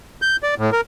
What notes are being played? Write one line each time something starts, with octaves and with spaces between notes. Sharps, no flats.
G6
D5
A2
A#4